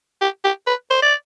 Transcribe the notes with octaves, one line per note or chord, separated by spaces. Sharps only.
G4
G4
B4
C5
D5